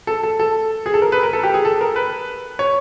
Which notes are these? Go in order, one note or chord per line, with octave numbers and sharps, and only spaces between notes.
A4
A4
A4
G#4
A4
A#4
B4
A#4
A4
G4
G#4
A4
A#4
B4
C#5